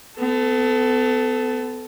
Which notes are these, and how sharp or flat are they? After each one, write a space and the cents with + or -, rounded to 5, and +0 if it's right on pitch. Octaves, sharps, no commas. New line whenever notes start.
B3 +35 A4 -5